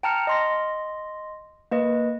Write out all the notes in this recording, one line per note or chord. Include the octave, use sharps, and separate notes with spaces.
G5 A5 A#5 F6 C#7
D#5 C6 A#6
A#3 B4 D#5